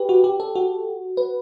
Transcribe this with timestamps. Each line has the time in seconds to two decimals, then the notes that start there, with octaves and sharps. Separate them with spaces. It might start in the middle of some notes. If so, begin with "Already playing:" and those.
Already playing: G4 B4
0.09 F#4
0.24 G4
0.40 A4
0.55 F#4
1.17 B4